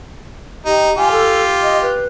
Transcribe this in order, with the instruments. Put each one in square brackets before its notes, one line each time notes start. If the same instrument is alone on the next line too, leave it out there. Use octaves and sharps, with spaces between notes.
[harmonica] D#4 [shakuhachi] G4
[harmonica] F4 G4 [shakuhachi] G#5
[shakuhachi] A4
D#5
B4